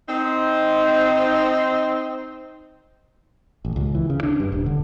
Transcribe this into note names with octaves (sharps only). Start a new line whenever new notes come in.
C4 D#4
A1
C#2
E3
C#3
D4
G2
D#1
D3